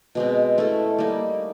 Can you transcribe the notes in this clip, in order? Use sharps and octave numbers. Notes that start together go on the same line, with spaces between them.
B2 G#3 C4
A3 C#4 E4 A4
G3 A#3 D#4